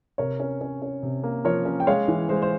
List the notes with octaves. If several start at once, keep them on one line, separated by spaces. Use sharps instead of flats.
C3 A#4 C#5
C#4
C#4
C#4
C3
A#3
F3 A#4 C#5
C#4
G5
G#3 C#5 F5
E3
G#3 C5
C5